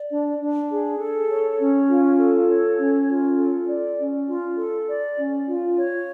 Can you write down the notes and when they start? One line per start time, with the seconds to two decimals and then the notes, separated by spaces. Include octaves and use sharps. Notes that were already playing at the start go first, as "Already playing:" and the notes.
Already playing: D5
0.10 D4
0.40 D4
0.70 G#4
0.99 A4
1.30 C#5
1.59 C#4
1.89 F4
2.19 A4
2.49 C#5
2.79 C#4
3.09 F4
3.39 A4
3.68 D5
3.99 C#4
4.28 F4
4.57 A4
4.88 D5
5.18 C#4
5.48 F4
5.77 C#5